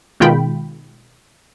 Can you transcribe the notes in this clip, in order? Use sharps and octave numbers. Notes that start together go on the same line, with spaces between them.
B2 D#3 G#3 F4 G5 B5